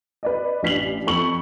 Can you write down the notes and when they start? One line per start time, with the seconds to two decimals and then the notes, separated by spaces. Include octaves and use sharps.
0.23 B4 D5 D#5
0.63 A1 D4 B6 C7 F7 F#7
1.07 F2 A4 C#6 F#7